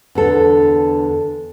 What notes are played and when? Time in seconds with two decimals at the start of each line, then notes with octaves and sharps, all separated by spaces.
0.15 E2 D3 A4